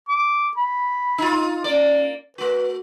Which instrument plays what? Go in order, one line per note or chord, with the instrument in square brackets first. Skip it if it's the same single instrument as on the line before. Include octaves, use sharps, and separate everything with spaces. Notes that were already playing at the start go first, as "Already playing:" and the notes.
[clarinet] D6
B5
[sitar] D#4 F4
[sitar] A#3 D5 [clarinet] C#4
[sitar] A3 F#4 [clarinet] B4